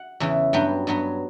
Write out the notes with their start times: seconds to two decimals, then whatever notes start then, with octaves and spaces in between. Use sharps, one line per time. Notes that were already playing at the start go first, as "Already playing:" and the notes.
Already playing: F#5
0.20 E2 C#3 E3
0.53 G2 F#3 B3 G5
0.87 G2 F#3 B3